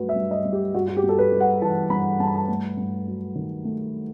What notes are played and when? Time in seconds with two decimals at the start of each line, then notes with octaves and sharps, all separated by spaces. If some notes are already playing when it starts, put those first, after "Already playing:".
Already playing: G2 F#3 A3 F#4 B4
0.09 E5
0.16 G2
0.31 D#5
0.45 G2
0.52 G4
0.75 G2 F#4
0.88 F#4
0.97 G4
1.03 G2
1.09 A4
1.18 B4
1.32 G3
1.40 F#5
1.62 E3 A5
1.90 G2 B5
2.20 G2 A5
2.27 B5
2.35 A5
2.48 A3
2.77 G2
3.07 F#3
3.35 D#3
3.65 A3